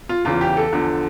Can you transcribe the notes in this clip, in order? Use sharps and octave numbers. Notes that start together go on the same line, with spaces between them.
F4
E2 C#3 E3 F4
G4
A4
E2 D3 F3